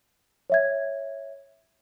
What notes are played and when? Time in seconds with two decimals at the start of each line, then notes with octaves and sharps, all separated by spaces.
0.50 C#5 E5 G#6